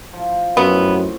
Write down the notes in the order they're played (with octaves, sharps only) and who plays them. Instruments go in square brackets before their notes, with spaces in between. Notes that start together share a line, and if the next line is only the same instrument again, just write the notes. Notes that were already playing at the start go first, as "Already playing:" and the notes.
[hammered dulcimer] F3 F4
[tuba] F#2 [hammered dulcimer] A2 C4 C#6 [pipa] B3